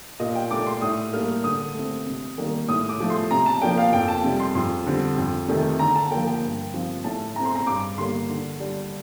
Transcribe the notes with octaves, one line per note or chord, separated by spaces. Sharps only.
A#2 D#5
G5
A3 D4 D6
C6
A2 D#6
G3 A#3 D4 F6
D3 D#6
A3 C4
C3
D#3 G3 A#3 D4
A2 D#6
D6
F3 A3
C6
C3 A#5
A5
F3 A#3 D4 G5
F5
F2 G5
A5
C3 G3
C6
F2 C6
D3 G3 C4
F2
C3 D#3 A3
D3 A#5
A5
F3 A#3 G5
G5
G2
F3 C4
A2 A5
A3 C4 A#5
C6
A#5
G2 D6
D3 G3 A#3 C6
D3
G3 D4